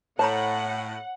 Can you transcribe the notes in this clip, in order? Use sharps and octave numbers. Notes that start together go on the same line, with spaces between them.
A2 C5 C#5 F#5 A5 A#5